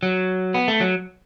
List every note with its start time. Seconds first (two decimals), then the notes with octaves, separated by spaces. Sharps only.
0.03 F#3
0.54 B3
0.68 A3
0.81 F#3